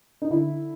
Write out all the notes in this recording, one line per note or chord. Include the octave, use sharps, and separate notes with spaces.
D#4
D3 E4